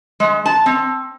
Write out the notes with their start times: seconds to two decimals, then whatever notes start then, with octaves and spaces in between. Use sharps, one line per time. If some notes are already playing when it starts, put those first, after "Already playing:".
0.20 G#3
0.46 A5
0.66 C4